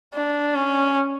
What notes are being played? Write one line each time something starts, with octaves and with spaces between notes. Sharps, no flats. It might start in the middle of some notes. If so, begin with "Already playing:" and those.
D4
C#4